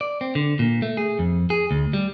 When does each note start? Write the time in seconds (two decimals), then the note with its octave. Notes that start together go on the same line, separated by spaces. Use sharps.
0.01 D5
0.21 C4
0.35 D3
0.59 A#2
0.82 A3
0.97 G#4
1.19 F2
1.50 G#4
1.71 D2
1.93 G3